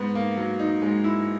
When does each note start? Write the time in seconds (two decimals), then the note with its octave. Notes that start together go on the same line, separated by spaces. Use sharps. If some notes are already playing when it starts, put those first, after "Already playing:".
Already playing: G#2 B3
0.15 A#3
0.37 F#3 A#3
0.59 D#4
0.82 G#2 G#3
1.04 E4